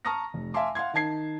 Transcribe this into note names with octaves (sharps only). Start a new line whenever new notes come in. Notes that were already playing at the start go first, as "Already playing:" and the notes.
A5 A#5 C#6 D#6 F6 A#6
F1
E5 F5 G#5 A5 C6 D6
F5 F#5 C6 G#6
D#3 D#4 A5 G#6 C7